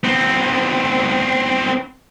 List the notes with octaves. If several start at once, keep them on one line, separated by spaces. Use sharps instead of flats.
B3 C4